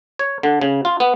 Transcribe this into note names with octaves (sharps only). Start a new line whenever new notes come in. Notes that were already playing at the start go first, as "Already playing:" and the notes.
C#5
D3
C#3
F4
B3